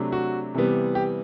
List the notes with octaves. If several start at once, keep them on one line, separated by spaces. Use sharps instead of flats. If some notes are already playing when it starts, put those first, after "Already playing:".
Already playing: C3 F#3 A3 D4
F#4
C3 E3 G3 B3
G4